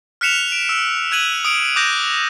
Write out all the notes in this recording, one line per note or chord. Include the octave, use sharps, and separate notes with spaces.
F6 F#6 B6 C#7 E7 F7
D7
E6
E6 F#6 G#6 D#7 F#7
D#6 D7
D6 D#6 F#6 G6 A#6